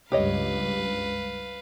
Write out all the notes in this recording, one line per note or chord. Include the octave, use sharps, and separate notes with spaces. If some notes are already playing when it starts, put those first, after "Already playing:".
C#2 G2 G4 B4 C#5 D#5 F5